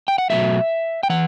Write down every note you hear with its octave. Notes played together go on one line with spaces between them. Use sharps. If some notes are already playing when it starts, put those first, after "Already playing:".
G5
F#5
B2 F#3 A3 E5
G5
E3 F#5